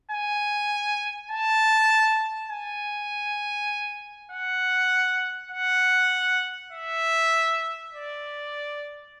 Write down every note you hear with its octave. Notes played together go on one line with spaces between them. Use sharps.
G#5
A5
G#5
F#5
F#5
E5
D5